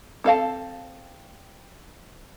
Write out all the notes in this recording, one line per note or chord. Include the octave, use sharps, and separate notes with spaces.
C4 A4 F5 A5